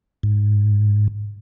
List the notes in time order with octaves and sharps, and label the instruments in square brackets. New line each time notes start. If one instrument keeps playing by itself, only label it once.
[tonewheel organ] G#2